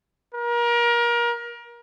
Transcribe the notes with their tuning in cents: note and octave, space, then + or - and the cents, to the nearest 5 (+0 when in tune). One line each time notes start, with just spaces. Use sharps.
A#4 +30